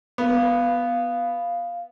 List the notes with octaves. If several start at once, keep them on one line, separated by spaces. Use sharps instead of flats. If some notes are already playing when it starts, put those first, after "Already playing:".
B3 F5